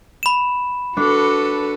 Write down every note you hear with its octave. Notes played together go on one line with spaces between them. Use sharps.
B5 E7
D4 F#4 A4 B4